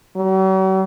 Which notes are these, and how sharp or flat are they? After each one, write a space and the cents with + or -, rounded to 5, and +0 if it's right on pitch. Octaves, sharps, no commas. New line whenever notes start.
F#3 +45